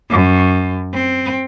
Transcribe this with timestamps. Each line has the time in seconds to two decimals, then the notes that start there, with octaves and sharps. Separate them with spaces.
0.10 F#2
0.94 C4